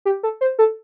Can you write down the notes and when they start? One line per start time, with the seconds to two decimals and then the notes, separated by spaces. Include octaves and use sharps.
0.05 G4
0.23 A4
0.41 C5
0.59 A4